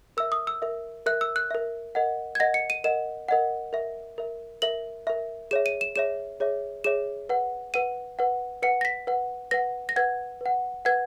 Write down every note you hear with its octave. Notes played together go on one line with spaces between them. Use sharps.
A#4 E5 E6
D#6
E6
A#4 E5
A#4 E5 F#6
E6
F#6
A#4 E5
A#4 D#5 F#5
G#6
A#4 D#5 F#5 A#6
C#7
D#7
A#4 D#5 F#5 E7
A#4 D#5 F#5
A#4 E5
A#4 E5
A#4 E5 F#7
A#4 E5
G#4 C#5 E5 E7
D#7
E7
G#4 C#5 E5 E7
G#4 C#5 E5
G#4 C#5 E5 E7
B4 F#5
B4 F#5 D#7
B4 F#5
B4 F#5 C#7
A#6
B6
B4 F#5
B4 F#5 A#6
A#6
B4 F#5 G#6
B4 F#5
B4 F#5 G#6